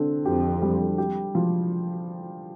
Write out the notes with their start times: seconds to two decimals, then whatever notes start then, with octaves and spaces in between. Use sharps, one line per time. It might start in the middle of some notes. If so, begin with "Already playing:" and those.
Already playing: D3 C4
0.25 F2 G4
0.62 G3
0.98 G4
1.35 F3